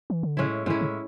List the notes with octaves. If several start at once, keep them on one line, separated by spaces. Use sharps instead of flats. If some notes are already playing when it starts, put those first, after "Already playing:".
E3
D3
A2 C#3 G#3 C#4 E4
A2 D3 G#3 C#4 E4
C#3